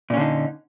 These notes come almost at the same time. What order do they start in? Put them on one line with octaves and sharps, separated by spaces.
A#2 C#4 D3 D#4